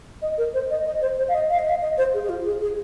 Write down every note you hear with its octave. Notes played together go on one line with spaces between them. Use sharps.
D#5
A#4
C5
D#5
D#5
C5
C5
F5
D#5
F5
D#5
F5
D#5
C5
G#4
G#4
F4
G#4
G#4